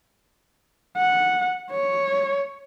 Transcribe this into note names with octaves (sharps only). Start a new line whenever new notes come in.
F#5
C#5